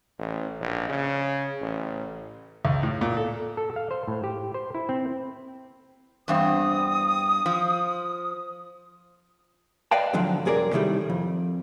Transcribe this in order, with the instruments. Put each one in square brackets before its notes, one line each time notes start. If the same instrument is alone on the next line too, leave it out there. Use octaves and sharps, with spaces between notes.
[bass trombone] A1
A#1
C#3
A1
[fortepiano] C#2
A2
A#2
A4
[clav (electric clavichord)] A4
F5
C5
A2
G4
C5
E4
C4
[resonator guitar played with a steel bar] E2 G2 C4 [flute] D#6
[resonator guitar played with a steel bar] F3
[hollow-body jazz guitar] B4 D5 D#5 F5 G5 A5
G#2 D3 F3 F#3
C2 F#2 G#4 A#4 D5
A2 C3 D#3 G3 A3
F2